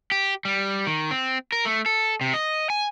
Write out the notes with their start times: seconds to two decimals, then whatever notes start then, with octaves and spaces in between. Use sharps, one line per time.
0.12 G4
0.45 G3
0.87 D#3
1.11 C4
1.52 A#4
1.65 A3
1.86 A4
2.21 C3
2.34 D#5
2.70 G#5